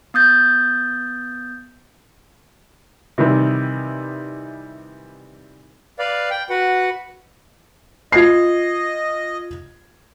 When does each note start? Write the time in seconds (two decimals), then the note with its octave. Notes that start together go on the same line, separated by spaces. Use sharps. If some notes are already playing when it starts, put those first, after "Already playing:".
0.14 B3 D#6 G6 A6
3.18 C3 D#3 E3 G3
5.99 B4 D5 F5
6.30 G5
6.50 F#4 B4 F#5
8.12 F4 D#5 G#6 C7